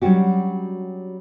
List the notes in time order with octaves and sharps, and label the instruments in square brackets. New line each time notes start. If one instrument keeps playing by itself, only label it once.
[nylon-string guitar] F#3 G3 C#4 D4 F#4 G4